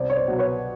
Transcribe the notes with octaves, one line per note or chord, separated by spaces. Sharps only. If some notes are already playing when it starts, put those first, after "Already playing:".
Already playing: C2 C5 D5
C#5
C5 D5
B2 F#3
B4 C#5